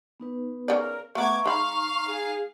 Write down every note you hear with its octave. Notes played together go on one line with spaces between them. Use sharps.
B3 D#4 B4
C#3 A#4 D5
A3 B3 E5 F5 A#5 C#6 D6 G#6
G#3 D#4 F5 A#5 B5
G#4